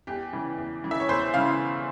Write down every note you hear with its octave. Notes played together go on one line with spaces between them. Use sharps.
E2 G4
C#3 E3
E2
C#3 E3
E5
C#5
E2 C5
C#3 E3 F5